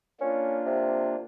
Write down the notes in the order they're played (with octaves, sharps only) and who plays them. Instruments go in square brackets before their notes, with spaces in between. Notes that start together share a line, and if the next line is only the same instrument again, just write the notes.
[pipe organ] A#3 D4 F4 [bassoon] C#4
[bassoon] C3